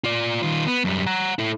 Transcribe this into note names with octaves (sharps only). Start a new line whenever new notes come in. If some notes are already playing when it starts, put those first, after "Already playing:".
F4 D5
D#3 F4
B3
F#2 G3
F#5 A#5
E4 A4